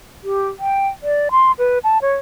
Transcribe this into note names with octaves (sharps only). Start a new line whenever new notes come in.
G4
G5
D5
C6
B4
A5
C#5